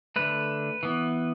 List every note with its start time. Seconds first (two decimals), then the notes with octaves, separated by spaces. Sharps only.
0.16 D3 A3 B4
0.83 E3 B3